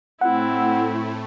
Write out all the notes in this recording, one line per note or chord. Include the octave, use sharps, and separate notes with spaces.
A2 A3 C4 E4 F#5